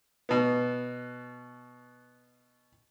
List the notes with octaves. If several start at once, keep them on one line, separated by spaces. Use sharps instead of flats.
B2 B3